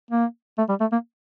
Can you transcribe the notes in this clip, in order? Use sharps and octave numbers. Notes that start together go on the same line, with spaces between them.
A#3
A3
G3
A3
A#3